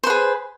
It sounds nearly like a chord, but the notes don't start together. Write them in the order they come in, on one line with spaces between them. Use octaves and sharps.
C5 B4 G#4